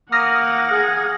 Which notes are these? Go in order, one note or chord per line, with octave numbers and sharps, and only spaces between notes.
A#3 F#5 D#6 F6 A#6
G#4